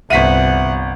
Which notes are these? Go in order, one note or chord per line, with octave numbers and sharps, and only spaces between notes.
G1 C2 E5 F#5 B6 D#7